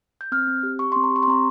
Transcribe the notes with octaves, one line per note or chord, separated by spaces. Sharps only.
G6
C4 F6
C4
G4
G4 C#6
C6
C4
A#5
G4 C#6
C6
C4 A#5